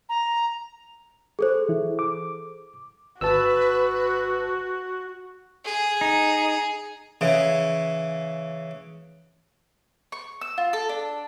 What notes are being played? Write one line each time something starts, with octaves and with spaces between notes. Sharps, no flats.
A#5
G#4 A4 C5
E3 E4
D6
G#1 F#4 B4 A5 E6
G#4
D#4
C#3 E3
C#6
E6
F4
A4
D4